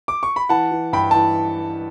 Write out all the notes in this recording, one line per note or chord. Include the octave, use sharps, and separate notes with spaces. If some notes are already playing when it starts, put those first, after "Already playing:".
D6
C#6
B5
E3 F#5 A5
E3
G2 G5 B5
E3 A5